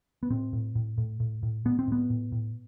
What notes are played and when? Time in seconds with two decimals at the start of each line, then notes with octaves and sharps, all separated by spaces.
0.23 B3
0.30 A2 C4
0.53 A2
0.75 A2
0.98 A2
1.20 A2
1.43 A2
1.65 A2 B3
1.79 C4
1.88 A2 B3
2.10 A2
2.32 A2